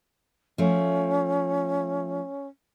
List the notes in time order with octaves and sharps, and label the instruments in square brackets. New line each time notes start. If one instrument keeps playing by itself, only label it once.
[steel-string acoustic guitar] F3 A3 [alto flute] C#4